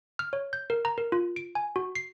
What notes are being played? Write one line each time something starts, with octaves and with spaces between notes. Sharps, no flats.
F6
C#5
G6
A#4
A#5
A#4
F4
D7
G#5
F#4
C7